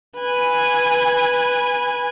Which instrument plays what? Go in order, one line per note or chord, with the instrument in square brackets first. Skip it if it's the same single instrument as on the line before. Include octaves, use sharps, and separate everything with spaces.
[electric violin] B4 G#5